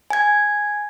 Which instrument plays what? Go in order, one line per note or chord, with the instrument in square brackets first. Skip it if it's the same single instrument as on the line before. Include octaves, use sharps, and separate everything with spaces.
[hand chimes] G#5 G#6